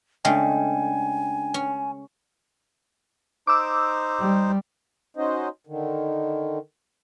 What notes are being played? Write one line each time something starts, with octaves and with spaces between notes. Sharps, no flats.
C#3 G#3 A3 D4 G5 G#5
C#4
D#4 C5 D6 E6
G3
C#4 D#4 F#4 C5 D#5
D3 D#3